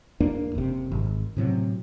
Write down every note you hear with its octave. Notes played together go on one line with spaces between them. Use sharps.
E2 A#3 D4
F#1 C3
G#1
A2 C3 F#3